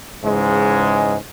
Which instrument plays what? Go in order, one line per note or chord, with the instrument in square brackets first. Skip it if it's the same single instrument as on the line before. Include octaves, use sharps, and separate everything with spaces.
[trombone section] G#2 C#3 E3 G#3